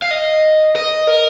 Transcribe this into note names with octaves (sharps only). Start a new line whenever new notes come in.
F5
D#5
D#5
A#4